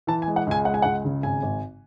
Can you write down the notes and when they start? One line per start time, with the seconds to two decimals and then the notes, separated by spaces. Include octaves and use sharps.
0.07 E3 A5
0.22 G#5
0.28 G#3
0.36 F#5
0.47 C#2 G#5
0.65 G#3 F#5
0.74 G#5
0.82 C#2 F#5
1.05 C#3
1.23 G#1 G#5
1.42 G#1